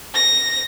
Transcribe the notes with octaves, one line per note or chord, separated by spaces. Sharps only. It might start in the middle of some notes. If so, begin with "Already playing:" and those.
A#6